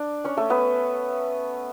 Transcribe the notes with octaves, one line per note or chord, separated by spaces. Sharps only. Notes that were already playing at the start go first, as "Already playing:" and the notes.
Already playing: D4 D5
C#4 C#5
A3 A4
B3 B4